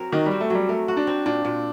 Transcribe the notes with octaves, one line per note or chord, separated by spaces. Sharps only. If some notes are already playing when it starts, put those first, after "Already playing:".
Already playing: F#3 C4 A#4
D#3 F#4
G3 C4
A3
F#3 G3
A3 A#4
F#4
D4
C4
A#2 D4
A#2